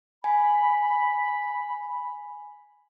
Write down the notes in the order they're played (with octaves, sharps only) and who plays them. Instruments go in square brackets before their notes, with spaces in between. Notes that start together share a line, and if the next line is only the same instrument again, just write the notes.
[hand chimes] G#5 [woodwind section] B5